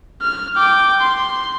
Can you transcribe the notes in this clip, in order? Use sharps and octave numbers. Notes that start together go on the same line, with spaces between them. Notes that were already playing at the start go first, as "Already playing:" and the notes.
F6
G5 D6
C6